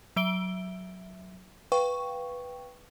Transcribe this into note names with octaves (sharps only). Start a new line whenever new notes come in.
F#3 E5 D7 G7
B4 F5 G5 C#6